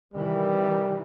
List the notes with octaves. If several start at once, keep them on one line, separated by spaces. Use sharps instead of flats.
C3 D#3 E3 G3